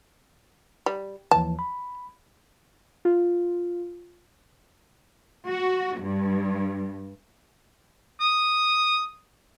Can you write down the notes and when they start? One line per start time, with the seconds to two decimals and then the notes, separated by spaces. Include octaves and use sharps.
0.86 G3
1.31 D#2 E3 F3 A5
1.59 B5
3.05 F4
5.49 F#4
6.00 G2
8.20 D#6